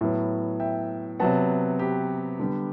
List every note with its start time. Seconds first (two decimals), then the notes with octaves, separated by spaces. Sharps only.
0.01 A2 F#3 B3
0.60 E5 G5
1.20 C3 F#3 B3 F#5 A5
1.79 G4 B4
2.39 D3 G3 B3